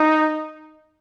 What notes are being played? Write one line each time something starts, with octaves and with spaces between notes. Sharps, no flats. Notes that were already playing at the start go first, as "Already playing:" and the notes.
Already playing: D#4